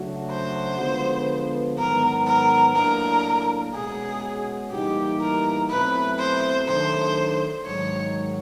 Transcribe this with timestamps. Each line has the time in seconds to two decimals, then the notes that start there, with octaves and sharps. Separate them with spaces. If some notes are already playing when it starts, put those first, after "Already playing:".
Already playing: C#3 F#3 A3 D4 F#4
0.31 C5
0.80 D3 F3 G#3 B3
1.78 G#2 D#3 F#3 B3 A#4
2.27 A#4
2.76 A2 F#3 A#3 D4 A#4
3.74 B2 G#3 C#4 F#4 G#4
4.72 A2 E3 G3 A#3 D#4 G4
5.21 A#4
5.70 B2 F#3 A3 C4 E4 B4
6.19 C5
6.68 D#3 F#3 A3 D4 C5
7.66 G#2 D#3 F#3 C#5